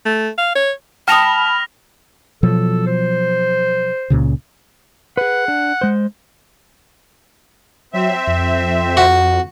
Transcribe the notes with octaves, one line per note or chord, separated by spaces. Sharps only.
A3
F5
C#5
G5 A5 B5 D#6 F6 A#6 F7
B2 F3 F#3 A4
C5
C#2 A#2 C#3
G#4 B4 F#5
D4
G#3 C5
F#3 C4 E5
F2
F#4